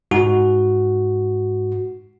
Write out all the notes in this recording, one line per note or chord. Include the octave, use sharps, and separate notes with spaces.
G#2 F#4